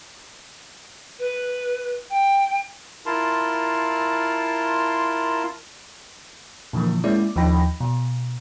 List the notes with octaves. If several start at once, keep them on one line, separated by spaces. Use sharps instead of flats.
B4
G5
E4 F4 A#4 A5 C6
A#2 D3 E3 F3 A#3
G#3 A#3 C#4 E4 D5
D#2 F3 D#4 G5 B5 A#6
B2